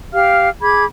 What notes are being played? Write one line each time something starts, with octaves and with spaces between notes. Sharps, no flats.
G4 F5 F6
G#4 B5 D6 G#6